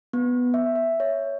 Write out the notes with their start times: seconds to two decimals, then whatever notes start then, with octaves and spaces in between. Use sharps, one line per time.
0.13 B3
0.54 E5
0.76 E5
1.00 C#5